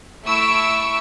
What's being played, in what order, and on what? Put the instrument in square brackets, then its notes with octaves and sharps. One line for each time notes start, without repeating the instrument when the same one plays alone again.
[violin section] A3 E4 C#6 E6 D7